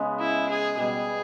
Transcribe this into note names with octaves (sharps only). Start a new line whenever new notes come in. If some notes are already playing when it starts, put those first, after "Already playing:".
Already playing: C#3 G#3 B3
E4
G#4
B2 G3 B3 G#4